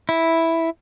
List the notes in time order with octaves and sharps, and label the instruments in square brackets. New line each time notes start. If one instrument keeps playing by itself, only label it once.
[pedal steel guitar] E4